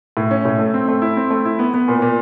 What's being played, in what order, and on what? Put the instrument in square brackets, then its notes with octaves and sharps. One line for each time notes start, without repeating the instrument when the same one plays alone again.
[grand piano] A2
C#4
A2
A3
C4
A3
E4
C4
A3
E4
B3
B3
A#2
A#2